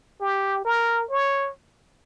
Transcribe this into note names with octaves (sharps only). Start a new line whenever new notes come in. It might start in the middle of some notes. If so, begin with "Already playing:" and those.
G4
A#4
C#5